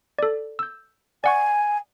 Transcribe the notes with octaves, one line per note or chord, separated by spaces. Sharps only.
A4 D5
E6 G6
D5 F#5 G#5 C#6